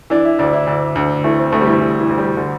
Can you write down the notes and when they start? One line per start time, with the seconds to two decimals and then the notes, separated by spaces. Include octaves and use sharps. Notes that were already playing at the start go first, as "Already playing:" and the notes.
0.10 E3 D4
0.25 E4
0.39 D2 D4
0.53 E4
0.67 D2 D4
0.95 D2
1.24 E3 A3
1.39 C4
1.52 D2 A3
1.61 G3
1.67 E3
1.80 E3
2.00 E3
2.09 D2
2.18 G3
2.37 D3